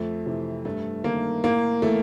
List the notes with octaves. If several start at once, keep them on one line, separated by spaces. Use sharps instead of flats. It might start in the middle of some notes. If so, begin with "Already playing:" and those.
Already playing: F2 A3
C3 E3
G2 A3
D#3 A#3
A2 A#3
E3 A3